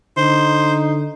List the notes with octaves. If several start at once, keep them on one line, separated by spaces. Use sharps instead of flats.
D3 D#4 C5